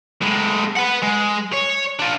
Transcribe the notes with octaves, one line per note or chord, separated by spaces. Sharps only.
A2 G#3
B4 F#5
G#3
C#5
D4 F4